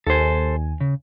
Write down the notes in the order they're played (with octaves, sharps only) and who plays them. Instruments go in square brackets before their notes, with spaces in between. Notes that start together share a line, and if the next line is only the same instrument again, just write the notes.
[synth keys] D#2 G#5 [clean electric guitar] A4 C5
[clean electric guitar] C#3